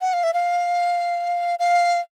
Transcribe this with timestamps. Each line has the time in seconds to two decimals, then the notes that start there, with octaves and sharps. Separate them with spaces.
0.01 F#5
0.13 F5
0.23 E5
0.34 F5
1.59 F5